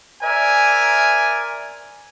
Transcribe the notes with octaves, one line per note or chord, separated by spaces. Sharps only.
A#4 C5 D5 E5 G#5